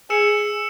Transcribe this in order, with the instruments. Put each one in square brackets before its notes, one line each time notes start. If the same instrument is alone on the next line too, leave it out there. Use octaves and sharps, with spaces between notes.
[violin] G#4 [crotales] E6 C#7 E7